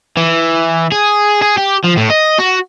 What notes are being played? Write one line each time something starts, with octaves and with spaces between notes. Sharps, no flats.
E3
G#4
G#4
G4
F3
A2
D#5
F#4